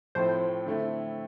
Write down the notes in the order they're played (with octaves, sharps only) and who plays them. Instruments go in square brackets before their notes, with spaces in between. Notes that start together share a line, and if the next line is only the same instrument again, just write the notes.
[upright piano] A2 F3 A3 C4 [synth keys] C5
[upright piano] D3 A3 C4 E4